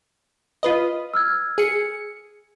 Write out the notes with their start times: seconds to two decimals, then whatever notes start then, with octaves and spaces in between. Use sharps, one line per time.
0.63 F4 B4 D#5
1.14 E6 F6 G#6
1.58 G#4 C#7